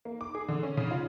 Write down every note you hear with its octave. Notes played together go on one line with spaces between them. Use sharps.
A#3
D6
G#4
D3
C#4
C#3
F4